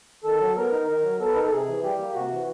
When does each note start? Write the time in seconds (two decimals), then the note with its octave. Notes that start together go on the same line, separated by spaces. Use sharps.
0.24 D#3 A4
0.40 F#3
0.56 B3 A#4
0.72 D#4
0.88 D#3 A#4
1.03 F#3
1.20 B3 A4
1.28 B4
1.35 D#4 A#4
1.44 A4
1.51 C3 G#4
1.67 E3
1.83 G3 G4
1.99 A#3
2.15 C3 F#4
2.31 E3